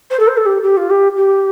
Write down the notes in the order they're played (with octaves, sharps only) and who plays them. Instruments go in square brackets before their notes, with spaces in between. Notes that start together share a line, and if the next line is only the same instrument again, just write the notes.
[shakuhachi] C5
A4
C5
A4
G4
G4
F4
G4
G4